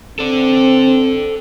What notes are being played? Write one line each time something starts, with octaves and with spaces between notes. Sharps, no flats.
C4 A4 D5